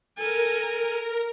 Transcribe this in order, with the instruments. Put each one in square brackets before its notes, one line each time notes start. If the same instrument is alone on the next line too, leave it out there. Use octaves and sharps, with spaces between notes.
[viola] A4 G#5 [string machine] A#4